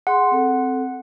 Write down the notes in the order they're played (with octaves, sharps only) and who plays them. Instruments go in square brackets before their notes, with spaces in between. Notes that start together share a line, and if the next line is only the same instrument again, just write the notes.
[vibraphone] G#4 C6 [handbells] F#5
[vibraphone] C4 A4